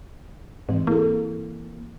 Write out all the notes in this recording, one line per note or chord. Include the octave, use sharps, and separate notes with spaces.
G#2 E3 C4
A#3 E4 G#4 A4